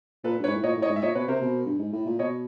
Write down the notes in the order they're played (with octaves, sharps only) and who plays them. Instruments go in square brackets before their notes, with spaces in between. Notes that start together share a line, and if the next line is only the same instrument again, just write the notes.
[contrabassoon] A#2 [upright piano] A4 B4
[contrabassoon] G2
[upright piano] B4 C#5
[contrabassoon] G#2
A2
[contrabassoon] A#2 [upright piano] C#5 D#5
[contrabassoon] A2
[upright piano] C#5 D#5
[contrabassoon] G#2
[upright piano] E5
[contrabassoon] A#2 [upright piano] C#5 D#5
[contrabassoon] B2 [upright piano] B4 C#5
[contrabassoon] C3 [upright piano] A#4 C5
[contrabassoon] B2
G2
G#2
A2
A#2
[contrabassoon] B2 [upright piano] C#5 D#5